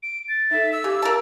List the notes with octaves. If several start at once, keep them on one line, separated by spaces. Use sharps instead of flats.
D7
A6
D#4 A4 E5
E6
C#3 G4 D6
A#4 F5 A5